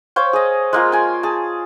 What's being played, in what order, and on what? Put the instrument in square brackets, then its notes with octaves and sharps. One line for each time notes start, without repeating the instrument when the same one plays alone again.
[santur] C5 C#5 F5 G5
G#4 D#5
G#3 A#3 F4
G5 G#5
G#4 A5